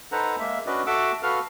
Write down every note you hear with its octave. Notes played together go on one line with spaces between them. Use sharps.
D#4 A4 B4 C5 F#5 A#5
G#3 A#3 E5
C#4 D4 F#4 B4 D5 D#5
F#4 A4 E5 F#5 D6 E6
F#4 A4 B4 F5 F6